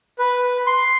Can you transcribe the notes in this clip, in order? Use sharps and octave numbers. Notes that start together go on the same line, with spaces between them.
B4
C6